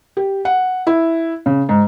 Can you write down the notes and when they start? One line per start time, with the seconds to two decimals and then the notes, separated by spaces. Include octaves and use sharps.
0.17 G4
0.45 F#5
0.87 E4
1.46 C#3
1.69 G#2